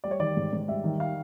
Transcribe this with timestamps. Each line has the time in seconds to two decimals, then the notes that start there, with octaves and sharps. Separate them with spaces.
0.04 G3 D5
0.11 C#5
0.20 D#3 D5
0.37 G#2
0.53 G#2
0.68 G3 E5
0.84 D#3
1.00 F5